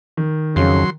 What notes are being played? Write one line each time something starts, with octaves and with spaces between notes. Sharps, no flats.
D#3
F2 C#3 F#3 C6